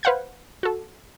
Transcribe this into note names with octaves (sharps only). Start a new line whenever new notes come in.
B4 C5 F5 F#5 G6 G#6
F#4 A4